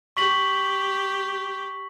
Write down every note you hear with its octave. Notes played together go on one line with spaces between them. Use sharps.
G4 C#6 B6 F#7